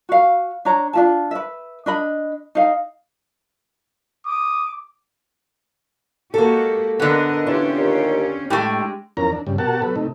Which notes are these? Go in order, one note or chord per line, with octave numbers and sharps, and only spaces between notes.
F#4 F5
D4 C#5 A#5
D4 F4 A5
B4 E5
D4 D#5 B5
D#4 F5
D6 D#6
G#3 A#3 F#4 G4 A4
D3 B3 D4 A#4 D#5
E3 C#4 D4 F4 G4
D#2
A2 G#3 A3 G4
E2 F3 C#4 A#4 A#5
D4
G2 C#3 G3
B2 F#4 G4 A#4 F#5 A5
F#3 B3 A4 B4
C3 A3 D#4